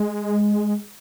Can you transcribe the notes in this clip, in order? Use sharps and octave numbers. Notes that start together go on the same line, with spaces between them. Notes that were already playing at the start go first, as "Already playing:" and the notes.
Already playing: G#3